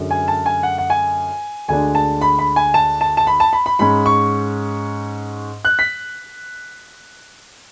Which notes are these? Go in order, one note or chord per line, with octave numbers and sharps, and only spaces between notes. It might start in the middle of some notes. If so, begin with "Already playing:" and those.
Already playing: F#2 D3 G#3
G#5
A5
G#5
F#5
F#5
G#5
D2 D3 G#3 D4 G#5
A5
B5
B5
G#5
A5
A5
A5
B5
A5
B5
B5
G#2 G#3 C#4 B5
C#6
F#6
B6